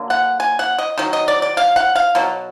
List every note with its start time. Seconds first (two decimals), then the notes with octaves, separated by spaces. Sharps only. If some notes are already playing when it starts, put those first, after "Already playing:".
Already playing: D3 F#3 A#3
0.10 F#5
0.40 G#5
0.59 F#5
0.78 D#5
0.98 D#3 F#3
1.13 D#5
1.28 D5
1.42 D5
1.57 F5
1.76 F#5
1.95 F5
2.15 B2 F#3